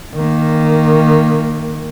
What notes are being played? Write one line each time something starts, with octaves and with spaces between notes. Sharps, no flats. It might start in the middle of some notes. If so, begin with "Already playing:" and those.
D#3 A#3